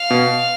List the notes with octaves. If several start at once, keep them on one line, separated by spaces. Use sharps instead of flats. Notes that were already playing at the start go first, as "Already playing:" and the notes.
Already playing: F5
B2